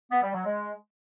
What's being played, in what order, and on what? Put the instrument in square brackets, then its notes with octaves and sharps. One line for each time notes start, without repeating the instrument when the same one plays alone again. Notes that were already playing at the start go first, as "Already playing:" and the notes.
[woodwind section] B3
G3
F#3
G#3